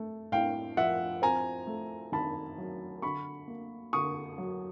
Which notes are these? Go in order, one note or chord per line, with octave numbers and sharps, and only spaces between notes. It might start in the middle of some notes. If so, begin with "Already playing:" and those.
Already playing: A3
A2 F5 G5
F3 E5 F#5
C4 G#5 A#5
A3
D#3 A5 B5
F#3
D3 B5 C#6
A#3
D3 C#6 D#6
F#3